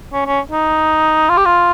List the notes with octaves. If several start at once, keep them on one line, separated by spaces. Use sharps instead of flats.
C#4
C#4
D#4
F4
G4
F4